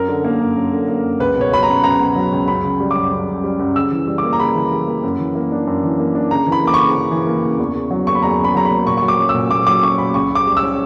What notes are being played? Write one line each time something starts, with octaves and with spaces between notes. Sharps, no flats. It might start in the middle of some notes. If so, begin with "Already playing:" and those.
Already playing: F#2 A#4
D3
A#3
F#2
F#2
D3
A#3
F#2
C#2 B4
B2 C#5
F#3 B5
A#5
C#2
C#2 A#5
B2
F#3
C#2
F#2 B5
C#3
G3
F#2 D6
F#2
C#3
G3
F#2
C#3 E6
E3
G3
D6
A#3
A#5
C#3 B5
E3
G3
A#3
F#2
E3
A#3
D4
F#2
E3
A#3
D4
C#3 A#5
E3
B5
A#3 D6
C#6
C#3
C#3
E3
A#3
C#3
E2
C#3
F#3
A#3 C#6
B5
E2 A#5
C#3
B5
F#3 A#5
B5
A#3
A#2 C#6
F#3 C#6
D6
C#4
E6
A#2
A#2 D6
F#3 D6
C#4 C#6
A#2 B5
C#2 C#6
C#3 D6
G3
E6
C#4